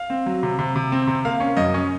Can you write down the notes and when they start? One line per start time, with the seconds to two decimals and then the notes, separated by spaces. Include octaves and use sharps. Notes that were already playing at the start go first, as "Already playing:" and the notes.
Already playing: F5
0.10 C4
0.26 F#3
0.43 C3
0.59 C3
0.76 C3
0.92 C4
1.07 C3
1.25 A#3 F5
1.40 C#4
1.57 F#2 D#5
1.74 C#4